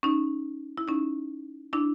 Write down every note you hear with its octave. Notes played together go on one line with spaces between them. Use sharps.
C#4 D#4
E4
C#4 D#4
D4 E4